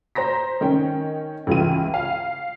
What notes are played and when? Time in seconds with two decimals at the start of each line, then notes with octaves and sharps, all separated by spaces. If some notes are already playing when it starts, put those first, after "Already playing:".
0.15 C5 A#5 A#6 B6
0.61 D#3 C#4 G5
1.47 C#2 E3 F4 D#7
1.94 F5